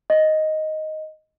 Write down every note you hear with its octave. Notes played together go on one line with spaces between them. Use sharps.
D#5